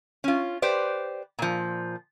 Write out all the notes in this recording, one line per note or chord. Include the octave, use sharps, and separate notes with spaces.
C#4 F4
G4 B4 C5 D5
A#2 F3